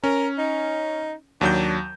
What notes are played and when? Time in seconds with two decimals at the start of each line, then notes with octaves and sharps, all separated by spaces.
0.04 C#4 A#4
0.38 D#4
1.41 D#2 F#3 D4 G6